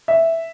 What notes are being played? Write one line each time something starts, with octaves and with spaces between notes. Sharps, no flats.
E5